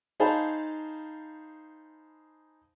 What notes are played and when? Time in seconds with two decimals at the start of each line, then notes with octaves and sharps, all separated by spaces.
0.20 D#4 G#4 C5 F5 A5 B5